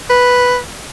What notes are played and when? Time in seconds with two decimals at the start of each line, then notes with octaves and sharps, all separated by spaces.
0.10 B4